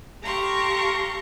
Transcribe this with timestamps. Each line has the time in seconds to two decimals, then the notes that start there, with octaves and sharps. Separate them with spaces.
0.23 G4 A4 F5 A#5 C6 C#6